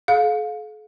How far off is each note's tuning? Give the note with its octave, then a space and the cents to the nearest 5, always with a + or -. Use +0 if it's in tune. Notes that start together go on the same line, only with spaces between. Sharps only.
A4 -45 F5 +25